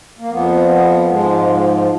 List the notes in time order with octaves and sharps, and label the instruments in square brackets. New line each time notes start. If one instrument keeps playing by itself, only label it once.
[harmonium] A#3
F2 F3 B3
B3
G#2 F3 G#3